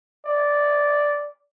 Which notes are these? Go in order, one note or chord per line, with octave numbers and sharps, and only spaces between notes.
D5